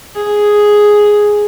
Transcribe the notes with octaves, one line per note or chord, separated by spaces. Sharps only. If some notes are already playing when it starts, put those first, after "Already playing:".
G#4